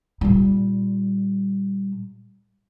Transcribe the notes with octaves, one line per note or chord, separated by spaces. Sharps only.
A#2 G3